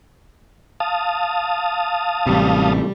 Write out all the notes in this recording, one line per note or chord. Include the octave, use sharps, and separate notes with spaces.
F5 A5 D#6
A1 C3 G3